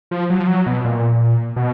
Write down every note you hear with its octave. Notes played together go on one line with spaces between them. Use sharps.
F3
F#3
F3
F#3
B2
A#2
B2